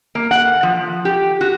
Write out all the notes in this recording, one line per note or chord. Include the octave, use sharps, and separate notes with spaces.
A#3
F#5
F3
G4
F#4